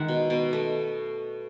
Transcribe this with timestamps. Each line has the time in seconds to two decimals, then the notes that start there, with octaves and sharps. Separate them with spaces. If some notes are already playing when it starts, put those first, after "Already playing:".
Already playing: D#3 G#3 E5 F#5
0.08 B2
0.30 B2
0.53 A3